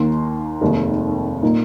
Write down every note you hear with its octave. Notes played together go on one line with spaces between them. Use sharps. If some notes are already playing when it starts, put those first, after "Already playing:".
Already playing: D#2 D#3 A#3 D#4 C6
F1 D#2 D#3 G#3
A#2 A#3 D#4